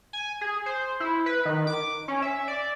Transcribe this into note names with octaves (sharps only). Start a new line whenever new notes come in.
G#5
G#4
C5
E4
B4
D#3
D6
C#4
E5
D5